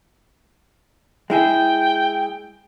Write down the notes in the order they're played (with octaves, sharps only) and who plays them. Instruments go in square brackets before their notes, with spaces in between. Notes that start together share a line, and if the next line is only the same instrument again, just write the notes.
[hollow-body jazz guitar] G#3 E4 G#4 [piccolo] G5